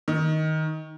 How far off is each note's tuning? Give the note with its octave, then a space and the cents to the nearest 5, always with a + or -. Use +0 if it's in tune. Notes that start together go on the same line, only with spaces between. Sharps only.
D#3 +10